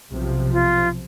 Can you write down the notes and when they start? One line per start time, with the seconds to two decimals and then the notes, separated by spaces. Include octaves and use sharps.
0.12 B1 C3 F3
0.53 F4